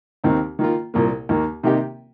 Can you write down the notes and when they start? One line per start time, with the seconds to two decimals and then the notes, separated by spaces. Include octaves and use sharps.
0.24 D#2 D#3 C4 D#4
0.59 D#3 A#3 F4
0.94 C2 A#2 A#3
1.29 D#2 D#3 A#3
1.63 C3 D#3 A#3 D#4 G4